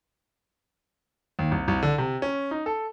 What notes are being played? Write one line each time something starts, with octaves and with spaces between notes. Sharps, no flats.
D#2
C2
C2
D3
C3
C#4
D#4
A4